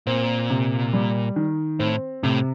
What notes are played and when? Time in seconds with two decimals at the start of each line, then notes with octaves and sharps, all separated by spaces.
0.07 A#2 C4
0.50 C3
0.93 G3
1.36 D#3
1.79 A2 C4
2.23 A2 C3